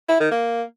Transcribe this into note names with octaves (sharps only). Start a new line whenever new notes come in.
E4
D#3
A#3